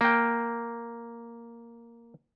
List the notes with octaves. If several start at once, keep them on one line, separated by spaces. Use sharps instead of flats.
A#3 G5